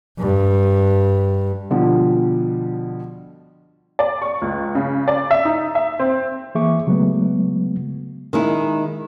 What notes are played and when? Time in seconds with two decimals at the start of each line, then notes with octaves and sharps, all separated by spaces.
0.19 G2
1.70 B2 D3 F3 G3
3.99 D5
4.22 C#6
4.42 C#2
4.75 C#3
5.08 D5
5.31 E5
5.45 D#4
5.75 E5
5.99 C4
6.55 E3 A#3 G#4 E5 C#6 D6
6.87 C#3 F#3 G#3 A3 B3
8.33 D#3 G#3 E4